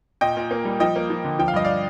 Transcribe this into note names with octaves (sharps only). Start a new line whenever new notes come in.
A#2 D#5 G5
A#2
A#3
G3
F3 D#5 G5
A#3
F3
D3
F3 G5
F5
G2 D#5
D5 F5